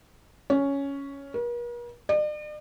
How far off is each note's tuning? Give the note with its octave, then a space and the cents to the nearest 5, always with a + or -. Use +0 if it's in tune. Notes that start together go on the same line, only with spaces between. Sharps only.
C#4 +5
A#4 +45
D5 +45